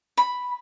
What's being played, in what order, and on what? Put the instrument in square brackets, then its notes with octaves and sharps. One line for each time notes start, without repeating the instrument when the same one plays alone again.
[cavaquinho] B5